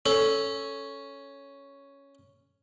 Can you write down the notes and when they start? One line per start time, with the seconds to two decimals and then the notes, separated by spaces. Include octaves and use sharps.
0.06 C#4 A4